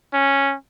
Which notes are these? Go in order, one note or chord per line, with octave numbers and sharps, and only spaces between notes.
C#4